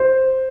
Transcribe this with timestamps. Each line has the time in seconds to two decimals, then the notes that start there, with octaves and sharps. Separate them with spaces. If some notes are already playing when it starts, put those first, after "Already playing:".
Already playing: C5